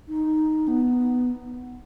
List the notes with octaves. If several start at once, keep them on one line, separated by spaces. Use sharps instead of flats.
D#4
B3